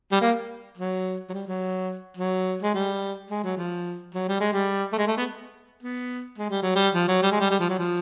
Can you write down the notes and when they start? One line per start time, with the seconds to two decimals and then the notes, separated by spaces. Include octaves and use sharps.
0.12 G3
0.21 A#3
0.78 F#3
1.29 F#3
1.33 G3
1.47 F#3
2.17 F#3
2.62 G#3
2.74 G3
3.30 G#3
3.43 F#3
3.57 F3
4.14 F#3
4.28 G3
4.40 G#3
4.53 G3
4.93 A3
4.98 G#3
5.07 A3
5.17 B3
5.83 B3
6.38 G#3
6.50 G3
6.62 F#3
6.75 G3
6.94 F3
7.08 F#3
7.22 G3
7.31 G#3
7.40 G3
7.51 G3
7.60 F3
7.69 F#3
7.79 F3